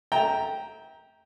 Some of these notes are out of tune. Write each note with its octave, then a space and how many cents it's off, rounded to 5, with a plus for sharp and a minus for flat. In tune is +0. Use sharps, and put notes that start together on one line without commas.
E5 -35 G5 +0 A#5 +0